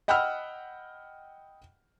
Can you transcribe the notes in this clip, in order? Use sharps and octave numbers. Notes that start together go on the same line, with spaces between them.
D#5 F#5 G5 B5 E6 F6